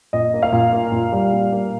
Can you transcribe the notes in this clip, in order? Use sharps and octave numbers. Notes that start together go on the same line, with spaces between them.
A#2 D#5
A#3
F5
A#2
A#3
A#2
G3
A#2
A#3